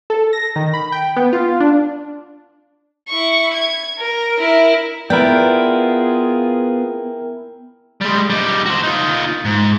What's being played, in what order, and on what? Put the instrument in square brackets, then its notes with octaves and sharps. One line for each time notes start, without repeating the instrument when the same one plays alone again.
[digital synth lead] A4
A#6
D#3
B5
G5
B3
F4
D4
[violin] E4 C#6
G#6
A#4
E4 A#4
[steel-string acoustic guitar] B3 [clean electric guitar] E4 B4 D5 [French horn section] F4 G#4 [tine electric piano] A#4 G5
[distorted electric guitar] G3 G#3
G3 D#4
F#4 C5
D#4 F4
G#2